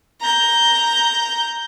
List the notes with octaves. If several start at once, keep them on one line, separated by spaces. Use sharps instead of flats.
A#5 G6